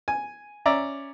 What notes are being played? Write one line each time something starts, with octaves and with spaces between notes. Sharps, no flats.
G#5
C#4 D5 E5 A#5